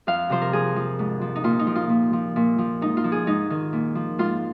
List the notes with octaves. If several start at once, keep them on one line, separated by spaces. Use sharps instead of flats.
F2 F5
C3 F3 C5
A#4
F2 G#4
F3
G#2
F3
D#4
A#2 F4
D#4
F3
F4
A#2
F3
A#2
F3
G#2 D#4
F4
F3
G#4
G#2 D#4
D#3
A#2
F3
G#2 F4